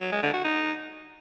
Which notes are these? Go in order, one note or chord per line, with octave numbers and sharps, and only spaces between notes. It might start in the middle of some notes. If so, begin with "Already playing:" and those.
F#3
G#3
D3
F#4
D#4